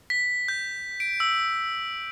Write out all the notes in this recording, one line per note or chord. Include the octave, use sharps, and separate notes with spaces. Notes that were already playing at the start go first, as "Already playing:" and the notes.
B6
G6
D7
E6